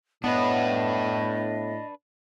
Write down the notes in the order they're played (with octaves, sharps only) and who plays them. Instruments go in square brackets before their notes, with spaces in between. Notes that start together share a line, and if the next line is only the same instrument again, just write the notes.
[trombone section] A2 [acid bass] B3 [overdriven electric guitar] D4 B4 [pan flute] D#5